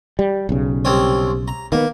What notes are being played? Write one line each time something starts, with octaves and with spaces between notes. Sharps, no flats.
G3
B1 C#3
C2 C4 C#5
A#5
D#3 A#3 B3